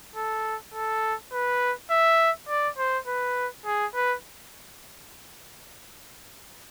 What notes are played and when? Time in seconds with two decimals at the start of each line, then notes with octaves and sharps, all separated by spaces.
0.16 A4
0.74 A4
1.33 B4
1.91 E5
2.49 D5
2.78 C5
3.08 B4
3.66 G#4
3.95 B4